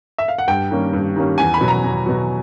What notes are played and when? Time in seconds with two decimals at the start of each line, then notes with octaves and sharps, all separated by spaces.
0.18 E5
0.28 F5
0.38 F#5
0.48 G2 G5
0.71 D#3 G3 A#3 C#4
0.93 G2
1.16 D#3 G3 A#3 C#4
1.38 E2 G#5
1.54 B5
1.61 B2 F#3
1.68 A#5
1.84 E2
2.06 B2 F#3